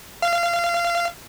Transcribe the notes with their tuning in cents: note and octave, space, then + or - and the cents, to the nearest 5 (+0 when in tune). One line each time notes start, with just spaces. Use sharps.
F5 -25